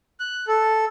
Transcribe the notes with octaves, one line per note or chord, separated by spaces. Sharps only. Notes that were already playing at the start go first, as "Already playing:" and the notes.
F#6
A4